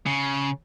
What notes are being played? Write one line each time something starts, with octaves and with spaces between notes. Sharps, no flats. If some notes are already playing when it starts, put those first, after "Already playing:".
C#3